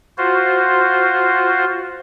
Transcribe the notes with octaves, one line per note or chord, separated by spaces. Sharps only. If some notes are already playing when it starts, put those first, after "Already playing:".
F4 F#4 C5